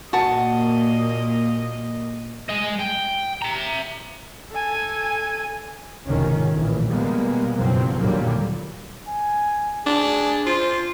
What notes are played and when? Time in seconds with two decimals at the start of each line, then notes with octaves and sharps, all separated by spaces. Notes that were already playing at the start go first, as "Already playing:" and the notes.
0.13 A#2 A#3 F#4 D#5 A5
2.50 G#3 D#5
2.80 G5
3.42 E5 A#5
4.51 A4 G#5
6.08 F1 C#2 G#2 D#3 C#4
6.52 A#1 A2 E3
6.90 B2 G3 G#3 A#3 B3
7.57 F#1 G2 B2 F3 F#3 C4
8.00 D#2 A#2 D3 F#3 G3 A#3
9.09 G#5
9.86 D4 G#4
10.46 F4 C5